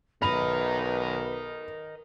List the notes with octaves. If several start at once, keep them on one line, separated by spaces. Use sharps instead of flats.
B1 A#4 B4 D#5 E5 B5 F7